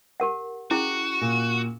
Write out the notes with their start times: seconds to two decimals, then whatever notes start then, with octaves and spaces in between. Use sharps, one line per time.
0.20 G4 A#4 F#5
0.71 C#4 E4 F#4 G#4
1.21 A#2